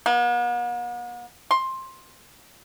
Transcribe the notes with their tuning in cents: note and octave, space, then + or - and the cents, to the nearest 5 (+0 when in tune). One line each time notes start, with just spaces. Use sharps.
B3 -45
C6 +15